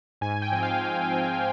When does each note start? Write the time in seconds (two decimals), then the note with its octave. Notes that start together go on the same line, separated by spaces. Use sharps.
0.21 G#2 G#5
0.42 G5
0.52 F3 C4
0.63 F5
0.83 G#2 F5
1.14 F3 C4